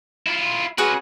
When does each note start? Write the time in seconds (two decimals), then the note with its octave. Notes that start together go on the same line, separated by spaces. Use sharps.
0.27 E4 F4
0.78 C#4 F#4 G#4 B4 F#5